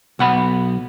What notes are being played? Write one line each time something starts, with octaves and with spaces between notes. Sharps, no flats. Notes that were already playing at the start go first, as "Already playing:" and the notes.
B1 F#5 B5